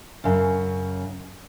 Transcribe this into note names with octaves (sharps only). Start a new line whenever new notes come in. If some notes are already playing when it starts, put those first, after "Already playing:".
F#2 C#3